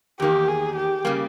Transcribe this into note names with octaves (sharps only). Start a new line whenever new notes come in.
E2 D#3 A#3 G4
G#4
G4
C#3 G3 A#3